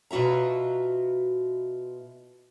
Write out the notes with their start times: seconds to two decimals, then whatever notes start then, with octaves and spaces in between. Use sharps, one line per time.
0.11 B2 F4 F#4 E5 A#5